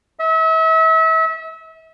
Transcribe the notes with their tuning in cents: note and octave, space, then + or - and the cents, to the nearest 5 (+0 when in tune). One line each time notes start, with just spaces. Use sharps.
E5 -35